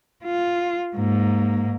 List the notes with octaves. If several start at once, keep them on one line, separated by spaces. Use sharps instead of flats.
F4
G#2 A#3